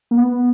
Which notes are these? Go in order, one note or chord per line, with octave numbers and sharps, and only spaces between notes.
A#3
B3